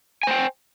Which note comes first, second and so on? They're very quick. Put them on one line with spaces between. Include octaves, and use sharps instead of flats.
G#5 C5 G5